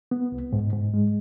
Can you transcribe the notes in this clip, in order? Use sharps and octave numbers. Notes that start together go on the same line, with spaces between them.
B3
C2
G#2
G#2
G#3